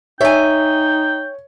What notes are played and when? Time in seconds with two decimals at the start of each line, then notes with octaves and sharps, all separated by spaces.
0.21 D#4 C#5 E5 G5 G#5